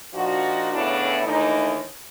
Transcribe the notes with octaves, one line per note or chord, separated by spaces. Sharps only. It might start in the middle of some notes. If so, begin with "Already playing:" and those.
A#2 F3 D4 D#4 F#4
A2 C#3 B3 D4 E4
D#2 E3 A3 D4 D#4